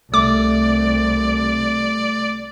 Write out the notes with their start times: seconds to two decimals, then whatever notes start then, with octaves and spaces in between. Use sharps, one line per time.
0.14 C2 A3 D5 D6